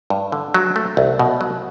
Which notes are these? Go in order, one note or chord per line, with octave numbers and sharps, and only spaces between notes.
G2
D3
F#3
A3
C2
B2
F#3